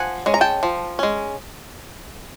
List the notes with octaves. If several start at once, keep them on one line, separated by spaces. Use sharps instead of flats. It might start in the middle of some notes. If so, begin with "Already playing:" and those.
Already playing: F3 F#5 G#5
G#3 C#4
A#5
G5 A5
F3
G#3 C#4